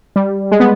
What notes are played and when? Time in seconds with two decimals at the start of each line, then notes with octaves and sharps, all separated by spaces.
0.16 G3
0.52 G#3
0.60 B3